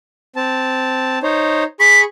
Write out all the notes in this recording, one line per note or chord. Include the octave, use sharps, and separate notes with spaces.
C4 A5
D#4 C5 C#5
G#4 B5 C#6 B6